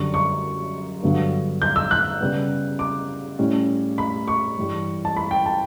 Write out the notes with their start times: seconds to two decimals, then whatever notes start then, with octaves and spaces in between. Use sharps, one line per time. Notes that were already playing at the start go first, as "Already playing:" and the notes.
Already playing: F#2 D3 G3 C#6
0.14 C#6
1.03 G2 D3 F#3 B3 D4
1.62 G6
1.76 E6
1.91 F#6
2.21 C#3 G3 B3
2.79 D6
3.39 A2 G3 C#4
3.98 B5
4.28 C#6
4.57 G2 E3 G3
5.05 A5
5.17 B5
5.31 G5
5.46 A5